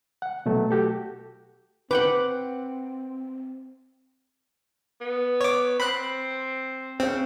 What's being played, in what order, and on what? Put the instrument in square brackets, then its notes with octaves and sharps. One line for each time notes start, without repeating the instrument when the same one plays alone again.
[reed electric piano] F#5
B2 F#3 A3
F#4 G4 A4
[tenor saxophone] C4 [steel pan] B4 [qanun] F#5 G5 D6
[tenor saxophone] B3
[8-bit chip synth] C#5 D6
[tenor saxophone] C4 [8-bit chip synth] B5 F#6
[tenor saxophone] C#3 [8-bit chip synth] C4